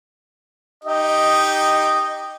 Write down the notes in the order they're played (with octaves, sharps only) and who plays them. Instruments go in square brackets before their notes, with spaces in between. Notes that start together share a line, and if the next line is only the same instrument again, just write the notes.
[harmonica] D#4 G4 [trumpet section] D#5